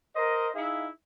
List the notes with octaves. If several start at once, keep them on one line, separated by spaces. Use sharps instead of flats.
A#4 C5 D#5
D#4 E4 G#4 E5 F5